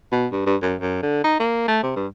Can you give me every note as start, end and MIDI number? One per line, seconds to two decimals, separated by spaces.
0.12 0.27 47
0.32 0.45 43
0.46 0.56 43
0.62 0.75 42
0.81 1.01 42
1.02 1.21 50
1.24 1.38 63
1.40 1.67 58
1.68 1.79 57
1.83 1.92 48
1.96 2.07 43